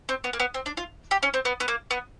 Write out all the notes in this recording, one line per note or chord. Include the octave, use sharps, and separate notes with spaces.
C4
B3
A#3
B3
C4
D4
F4
G4
C#4
C4
B3
B3
A#3
B3